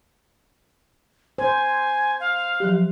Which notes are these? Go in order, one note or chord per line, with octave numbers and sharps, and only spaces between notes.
C5 G#5
F5
F3 F#3 G4